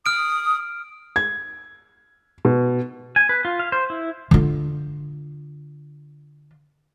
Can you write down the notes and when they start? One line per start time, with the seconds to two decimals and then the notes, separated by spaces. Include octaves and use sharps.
0.06 D#6 F6 D7
1.16 G#6
2.45 B2
3.16 G#5
3.29 B4
3.45 F4
3.59 F5
3.72 C5
3.90 E4
4.31 D3 F4